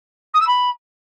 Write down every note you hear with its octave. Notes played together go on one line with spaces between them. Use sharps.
D#6
E6
B5